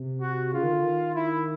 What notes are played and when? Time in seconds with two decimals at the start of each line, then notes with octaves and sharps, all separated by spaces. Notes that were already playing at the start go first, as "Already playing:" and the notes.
Already playing: C3
0.21 F#4
0.53 C#3 F4
0.63 D#3
0.73 D3
0.83 D#3
1.16 E4